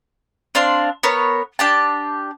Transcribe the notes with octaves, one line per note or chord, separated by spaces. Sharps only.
C4 D4 F5 C6
B3 A#4 C#5
D4 G4 A5